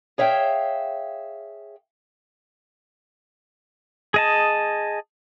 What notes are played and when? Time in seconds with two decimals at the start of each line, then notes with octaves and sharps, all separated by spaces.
0.18 G#4 C#5 E5 F5 G5
4.14 G#4 D#5 A5